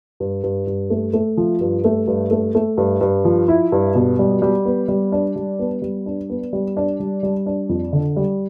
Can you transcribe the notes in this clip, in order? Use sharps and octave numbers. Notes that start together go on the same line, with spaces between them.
G2
G2
G2
A3
A3
F3
G2
A3
G2
A3
A3
G2
G2
F3
E4
G2
B2
G3
G3
B3
G3
D4
G3
B3
G3
D4
B3
G3
D4
G3
G3
D4
F2
D3
G3